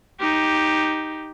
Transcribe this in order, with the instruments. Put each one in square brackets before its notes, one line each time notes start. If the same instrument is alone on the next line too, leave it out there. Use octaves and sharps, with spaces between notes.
[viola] D#4 G4